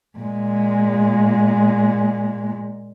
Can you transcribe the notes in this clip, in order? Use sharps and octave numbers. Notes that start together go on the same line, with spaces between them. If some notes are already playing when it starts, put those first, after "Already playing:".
A#2 G#3